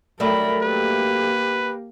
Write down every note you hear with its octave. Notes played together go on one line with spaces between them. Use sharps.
F#3 G3 A3 A#4 B5
A#3 G4 B4